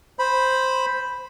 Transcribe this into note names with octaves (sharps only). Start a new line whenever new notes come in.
C5 B5